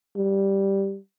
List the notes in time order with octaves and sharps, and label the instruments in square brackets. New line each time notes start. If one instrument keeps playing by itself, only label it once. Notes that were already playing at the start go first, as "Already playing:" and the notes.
[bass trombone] G3